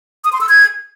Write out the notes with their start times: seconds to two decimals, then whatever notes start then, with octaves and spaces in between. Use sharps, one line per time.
0.24 D#6
0.33 C6
0.41 E6
0.49 G#6